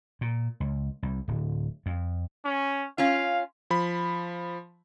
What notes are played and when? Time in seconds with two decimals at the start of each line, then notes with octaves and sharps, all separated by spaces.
0.21 A#2
0.60 C#2
1.03 C2
1.28 D1
1.86 F2
2.45 C#4
2.98 C#4 F4 F5
3.70 F3 B5